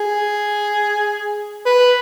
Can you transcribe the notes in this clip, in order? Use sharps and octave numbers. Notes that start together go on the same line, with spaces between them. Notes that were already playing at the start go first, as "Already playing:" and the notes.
Already playing: G#4
B4